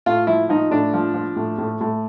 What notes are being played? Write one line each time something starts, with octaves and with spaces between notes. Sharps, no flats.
A2 F4
F3 E4
F3 D#4
A2 D4
F3
F3
A2
A2
A2